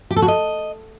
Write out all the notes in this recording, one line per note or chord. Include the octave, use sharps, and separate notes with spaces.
G4
A4
F#4
D#5